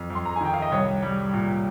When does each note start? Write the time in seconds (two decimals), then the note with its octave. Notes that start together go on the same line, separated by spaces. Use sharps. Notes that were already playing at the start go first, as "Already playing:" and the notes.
Already playing: F2
0.10 F2
0.15 C6
0.26 A#5
0.36 G#5
0.41 D#3 G5
0.54 F5
0.62 D#5
0.71 C2 C#5
1.03 G3
1.33 A#2